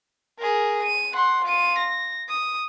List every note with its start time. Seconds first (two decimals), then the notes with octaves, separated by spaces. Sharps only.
0.39 G#4 A#4
0.82 D#7
1.13 F#5 C6
1.45 F4 D#7
1.78 A#6
2.29 D#6